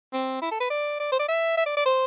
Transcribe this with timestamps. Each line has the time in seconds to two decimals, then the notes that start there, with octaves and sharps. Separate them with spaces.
0.13 C4
0.42 E4
0.51 A4
0.60 B4
0.70 D5
1.00 D5
1.12 C5
1.19 D5
1.29 E5
1.57 E5
1.66 D5
1.77 D5
1.86 C5